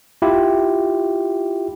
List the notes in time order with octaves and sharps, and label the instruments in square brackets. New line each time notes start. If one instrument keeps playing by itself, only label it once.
[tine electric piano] E4 F4 G4